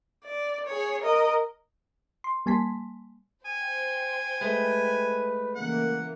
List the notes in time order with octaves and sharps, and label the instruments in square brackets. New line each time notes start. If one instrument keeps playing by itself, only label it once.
[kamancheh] D5
G#4 C#5
A#4 D#5
[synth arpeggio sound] C6
G3 A#3 G#5 A5 C6 B6
[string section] C5 G5 [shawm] G#5
[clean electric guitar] G#3 A3 [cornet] B4
[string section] C#3 E3 A#3 [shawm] F#5